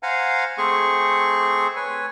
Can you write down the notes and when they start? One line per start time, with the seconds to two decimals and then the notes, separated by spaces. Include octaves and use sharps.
0.03 C5 F5 F#5 G#5 A#5
0.58 A3 C4 G#4 C#6
1.76 B4 C#5 G#5